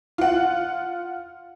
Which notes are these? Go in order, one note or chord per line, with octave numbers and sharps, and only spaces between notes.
F4 F#5